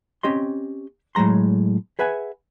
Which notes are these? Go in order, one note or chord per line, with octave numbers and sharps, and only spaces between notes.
C4 C#4 G4 D#5 C6
A2 F#3 G#3 A#5 C6
G#4 B4 E5 F#5 G#5